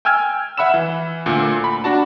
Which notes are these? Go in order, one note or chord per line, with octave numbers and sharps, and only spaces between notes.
G5 G#5 E6 F6 G#6
E5 F#5 B5 E6 E7
E3
D2 A#2
B5
D4 F#4 A5